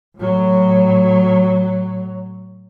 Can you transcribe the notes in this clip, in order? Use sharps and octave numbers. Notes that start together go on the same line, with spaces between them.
A2 F#3